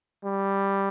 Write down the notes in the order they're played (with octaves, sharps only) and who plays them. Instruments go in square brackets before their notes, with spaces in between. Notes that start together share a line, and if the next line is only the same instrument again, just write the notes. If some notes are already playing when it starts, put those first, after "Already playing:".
[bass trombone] G3